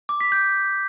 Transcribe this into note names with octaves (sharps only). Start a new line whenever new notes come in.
D6
B6
G6